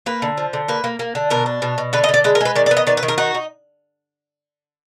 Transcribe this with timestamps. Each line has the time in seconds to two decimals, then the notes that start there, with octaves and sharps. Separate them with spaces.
0.06 A#3 B4
0.22 D3
0.38 F3
0.53 D3
0.68 A#3 B4
0.84 A#3
0.99 A#3
1.15 D3
1.30 B2 A#4
1.46 D4
1.62 B2
1.78 B2
1.93 D3 B4
2.04 D#5
2.09 D3
2.14 D5
2.24 G#3 B4
2.35 A#4
2.41 G#3 B4
2.56 D#3 D5
2.66 D5
2.71 B3
2.77 D#5
2.87 D#3 D5
2.97 B4
3.03 D#3
3.08 A#4
3.18 D#4 F#4
3.34 D#4